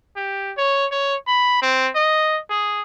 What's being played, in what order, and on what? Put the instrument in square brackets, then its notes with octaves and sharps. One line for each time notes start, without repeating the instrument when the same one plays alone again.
[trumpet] G4
C#5
C#5
B5
C4
D#5
G#4